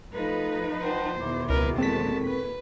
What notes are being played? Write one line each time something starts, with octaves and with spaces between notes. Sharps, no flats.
F3 A3 D#4 A4 B4 F5
C5 F#5 G5 A5
E2 B2 D#3 E5 B5 D6
C#2 A#4 B4
G#3 C4 A4 A#4 A5 C#6 B6
B4